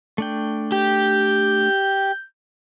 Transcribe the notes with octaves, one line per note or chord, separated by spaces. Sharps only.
A3 D4 G5
G4 G6